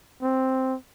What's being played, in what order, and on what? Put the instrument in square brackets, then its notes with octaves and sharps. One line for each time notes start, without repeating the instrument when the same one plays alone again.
[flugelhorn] C4